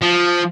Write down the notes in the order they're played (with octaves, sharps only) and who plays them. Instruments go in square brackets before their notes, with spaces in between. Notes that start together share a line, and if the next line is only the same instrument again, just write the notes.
[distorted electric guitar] F3